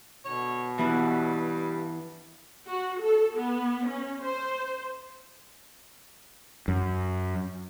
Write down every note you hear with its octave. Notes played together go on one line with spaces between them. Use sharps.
B2 D3 C#5
G2 E3 B3 E4
F#4
A4
B3
C#4
C5
F#2